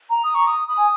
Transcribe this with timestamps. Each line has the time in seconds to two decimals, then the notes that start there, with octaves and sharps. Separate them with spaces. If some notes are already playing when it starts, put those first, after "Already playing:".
0.09 A#5
0.24 D#6
0.35 C#6
0.47 D#6
0.68 B5 D#6
0.78 G#5